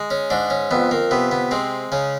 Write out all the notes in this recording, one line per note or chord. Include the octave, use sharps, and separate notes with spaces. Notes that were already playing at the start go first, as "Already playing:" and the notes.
Already playing: G#3
C#4
G#2 D4
C#4
F2 B3
A#3
C3 B3
B3
G#3 C4
C#3 C#4